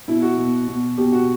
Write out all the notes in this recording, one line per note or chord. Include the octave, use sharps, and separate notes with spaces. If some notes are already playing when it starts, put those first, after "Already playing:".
B2 E4
F#4
B2
B2
B2 G4
F#4